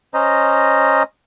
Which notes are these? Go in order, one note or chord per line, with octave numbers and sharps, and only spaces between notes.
C#4 C5 D#5 A#5